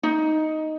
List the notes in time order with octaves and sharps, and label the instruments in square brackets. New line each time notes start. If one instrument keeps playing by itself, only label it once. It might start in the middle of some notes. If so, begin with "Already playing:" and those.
[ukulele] D#4